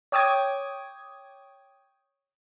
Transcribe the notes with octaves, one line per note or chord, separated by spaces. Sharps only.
C#5 G5 D6 D#6 G#6